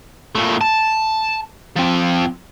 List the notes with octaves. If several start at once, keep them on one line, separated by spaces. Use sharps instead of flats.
A#2 A3
A5
F3 C4